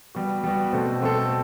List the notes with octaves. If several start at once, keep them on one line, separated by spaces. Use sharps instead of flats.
G3 B3 F#4
G3 B3 F#4
B2 A3 C4 F#4 A4
B2 A3 C4 F#4 A4